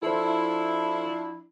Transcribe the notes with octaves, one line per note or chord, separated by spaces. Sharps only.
F3 D4 E4 A4 C5